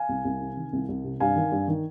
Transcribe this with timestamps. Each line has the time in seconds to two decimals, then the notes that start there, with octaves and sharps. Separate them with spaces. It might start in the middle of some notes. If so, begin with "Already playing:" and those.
Already playing: F5 G#5
0.09 C2
0.25 C2
0.41 C3
0.57 D#3
0.73 C2
0.89 C2
1.04 C3
1.20 G2 F5 G#5
1.36 D#3
1.52 G2
1.68 D#3